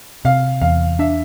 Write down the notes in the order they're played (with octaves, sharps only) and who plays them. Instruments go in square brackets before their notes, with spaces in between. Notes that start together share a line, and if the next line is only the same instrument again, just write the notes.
[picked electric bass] C3 [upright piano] F5
[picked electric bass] E2 [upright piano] F5
[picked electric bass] D4 [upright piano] E5